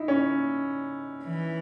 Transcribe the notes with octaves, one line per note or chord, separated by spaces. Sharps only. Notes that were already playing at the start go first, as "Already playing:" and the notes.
Already playing: D#4 E4
C#4
E3